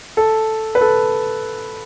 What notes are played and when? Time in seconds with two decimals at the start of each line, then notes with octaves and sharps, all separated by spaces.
0.17 A4
0.75 B4
0.81 A4